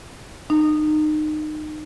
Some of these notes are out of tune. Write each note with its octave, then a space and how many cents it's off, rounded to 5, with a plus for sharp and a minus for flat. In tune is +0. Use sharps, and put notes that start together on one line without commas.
D#4 -25